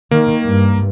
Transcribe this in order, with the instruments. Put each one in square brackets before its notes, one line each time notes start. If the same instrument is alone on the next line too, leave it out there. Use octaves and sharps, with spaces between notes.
[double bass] D#3 [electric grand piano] A#3
[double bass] G2